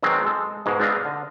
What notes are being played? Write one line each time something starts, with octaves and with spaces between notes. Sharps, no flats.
B2 D#3 F#3 G#3 C4
G#3 A4
G#2 B2 G#3
B3 C4 D4 D#5 F5
D3